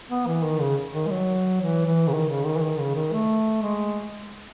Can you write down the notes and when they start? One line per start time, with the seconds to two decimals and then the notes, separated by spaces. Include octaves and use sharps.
0.10 B3
0.27 E3
0.43 D#3
0.60 C#3
0.94 D#3
1.07 G#3
1.11 F#3
1.61 E3
1.86 E3
2.08 C#3
2.12 D#3
2.29 C#3
2.45 D#3
2.57 E3
2.62 D#3
2.79 C#3
2.95 D#3
3.12 A3
3.63 G#3